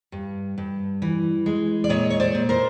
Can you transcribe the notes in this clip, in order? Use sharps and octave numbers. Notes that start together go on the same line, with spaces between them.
G2
G2
E3
G#3
D5
A#2 C#5 D#5
C#5
C5 D5
A#2
A#4 C5